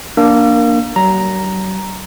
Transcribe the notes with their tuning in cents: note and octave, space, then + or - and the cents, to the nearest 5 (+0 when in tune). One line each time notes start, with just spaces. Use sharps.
A#3 +0 D4 +0 E6 +45
F#3 +40 A#5 +0